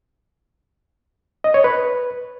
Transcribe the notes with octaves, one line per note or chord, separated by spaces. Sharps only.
D#5
C#5
B4